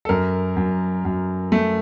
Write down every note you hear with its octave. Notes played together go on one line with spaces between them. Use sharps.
A4
F#2 A#4
F#2
F#2
A3